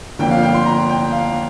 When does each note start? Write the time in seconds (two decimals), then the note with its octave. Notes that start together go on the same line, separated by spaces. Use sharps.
0.19 G1 F2 D3 A#3 G5
0.31 F5
0.43 G5
0.54 C6
0.66 A#5
0.89 G5
1.12 F5